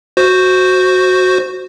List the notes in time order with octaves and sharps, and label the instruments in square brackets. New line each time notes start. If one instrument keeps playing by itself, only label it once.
[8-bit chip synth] F#4 C5